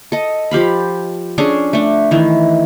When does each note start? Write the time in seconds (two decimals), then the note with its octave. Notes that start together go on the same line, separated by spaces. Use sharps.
0.12 A4 D#5
0.51 F3 G4 F5 B5
1.38 C#4 D4 G#4 A4
1.73 A3 D4
2.11 D#3 E3